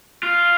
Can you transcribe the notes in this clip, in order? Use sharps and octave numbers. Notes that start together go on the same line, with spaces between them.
F4